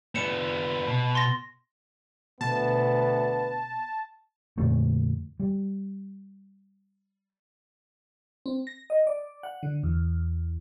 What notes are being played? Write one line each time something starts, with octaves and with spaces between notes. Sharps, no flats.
B3 D4 C#7 E7
B2
C6 A6 A#6
D2 B2 B3 A5
F2 A#2 D3 A3
G3
C4
A#6
D#5
D5
F#5
D3
E2